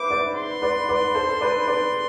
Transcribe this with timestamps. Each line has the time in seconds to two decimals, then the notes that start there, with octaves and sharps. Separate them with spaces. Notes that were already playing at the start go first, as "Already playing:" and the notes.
Already playing: B4 C5 E5 D6
0.11 B4 D5
0.36 C6
0.62 B4 D5
0.89 B4 D5
1.15 A4 C5
1.41 B4 D5
1.67 B4 D5